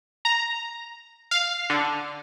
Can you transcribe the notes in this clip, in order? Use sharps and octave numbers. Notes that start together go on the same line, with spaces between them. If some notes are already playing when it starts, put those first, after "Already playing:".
A#5
F5
D3